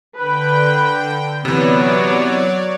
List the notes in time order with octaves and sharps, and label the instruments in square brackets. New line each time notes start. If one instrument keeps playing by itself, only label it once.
[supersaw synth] D3 G5 [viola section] B4
[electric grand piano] C3 E3 [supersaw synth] F#3 C#5 D5 [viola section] B3